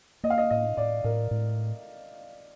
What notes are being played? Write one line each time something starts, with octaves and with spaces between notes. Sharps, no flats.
A#3 D#5
F5
D#5
A2 D#5
A2 D5
A2 A#4
A2